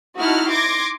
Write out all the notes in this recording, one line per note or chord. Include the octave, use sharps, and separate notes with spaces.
D#4 E4 F#4 F#5 A5 F6
C6 D6 G#6 A#6